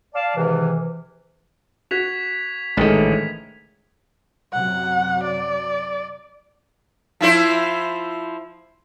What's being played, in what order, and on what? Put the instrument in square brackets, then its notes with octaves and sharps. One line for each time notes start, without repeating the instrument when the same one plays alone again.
[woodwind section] D5 F5 A5
G#2 C3 D#3 E3
[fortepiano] F#4 [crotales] G#6 B6 F7
[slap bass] A1 D3 [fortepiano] G#2 D#3 A3
[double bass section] F#2 C3 F#3 [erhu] F#5
[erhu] D5
[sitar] F3 E4 C5